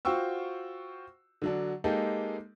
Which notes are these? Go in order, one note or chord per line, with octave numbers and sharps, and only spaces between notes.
F4 F#4 C5 G5 C#6 E6
D3 F#3 D4
G#3 A#3 D#4 G4 A4